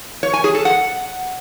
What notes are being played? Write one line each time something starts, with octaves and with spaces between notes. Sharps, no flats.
C#5
G#5
G#4
A4
F#5